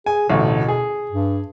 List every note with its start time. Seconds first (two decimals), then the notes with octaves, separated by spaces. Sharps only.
0.06 G#4 G#5
0.30 A1 D2 B2
0.68 G#4
1.11 G2